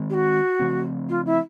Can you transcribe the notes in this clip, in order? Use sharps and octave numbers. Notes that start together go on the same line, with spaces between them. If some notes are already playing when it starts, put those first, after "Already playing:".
Already playing: D#3 G#3 C4
G4
F#4
C#3 F3 A3 C4
F4
E4